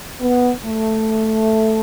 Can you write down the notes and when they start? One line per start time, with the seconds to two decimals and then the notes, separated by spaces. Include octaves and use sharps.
0.21 B3
0.64 A3